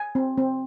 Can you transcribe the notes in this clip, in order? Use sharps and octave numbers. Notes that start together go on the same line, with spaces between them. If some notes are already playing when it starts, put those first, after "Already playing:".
Already playing: G#5
C4
C4